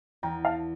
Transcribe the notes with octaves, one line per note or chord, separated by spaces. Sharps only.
E2 G5 A#5
F5 A5